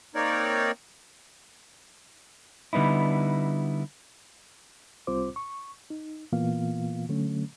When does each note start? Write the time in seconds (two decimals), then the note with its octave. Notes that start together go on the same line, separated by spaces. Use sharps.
0.15 A#3 C4 D#4 A#4 C#5 D5
2.73 D3 G3 B3 D#4 E4
5.07 C2 G3 C4 F4 C5 D6
5.36 C#6
5.90 D#4
6.32 A#2 E3 A#3 B3 F4 F5
7.09 D3 F#3 A3 C#4